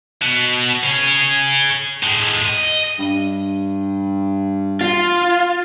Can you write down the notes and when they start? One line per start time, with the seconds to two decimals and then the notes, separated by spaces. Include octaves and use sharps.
0.22 B2
0.83 G#4 C#5
2.03 A2 G#3
2.45 D#5
2.99 G2
4.81 F4